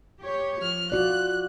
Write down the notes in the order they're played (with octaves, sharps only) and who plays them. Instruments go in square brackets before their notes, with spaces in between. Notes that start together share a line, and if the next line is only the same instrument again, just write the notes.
[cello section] G4 C#5
[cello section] F3 [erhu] F6
[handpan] F4 F#4 D5 [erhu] F#6